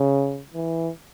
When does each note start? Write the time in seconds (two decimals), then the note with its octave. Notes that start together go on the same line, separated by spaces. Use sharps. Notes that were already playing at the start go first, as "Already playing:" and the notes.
Already playing: C#3
0.54 E3